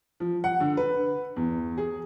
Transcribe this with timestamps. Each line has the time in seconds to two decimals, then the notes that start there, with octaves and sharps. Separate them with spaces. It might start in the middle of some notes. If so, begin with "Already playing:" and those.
0.20 F3
0.44 F#5
0.60 D3
0.77 B4
1.37 E2
1.78 G#4